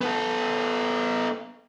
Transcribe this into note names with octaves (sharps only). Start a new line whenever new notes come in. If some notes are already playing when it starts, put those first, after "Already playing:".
B3 A4